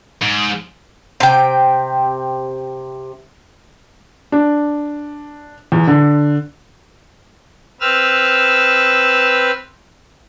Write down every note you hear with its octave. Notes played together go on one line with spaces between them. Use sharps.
G#2
C3 G5
D4
E2
D3
C4 B4 E6 F6